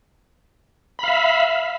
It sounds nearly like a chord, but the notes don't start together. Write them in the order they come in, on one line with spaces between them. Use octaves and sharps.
B5 F5 E5